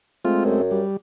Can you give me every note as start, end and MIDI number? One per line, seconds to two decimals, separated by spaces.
0.25 0.62 56
0.25 0.62 57
0.25 0.62 60
0.25 0.41 65
0.45 0.81 42
0.71 0.97 55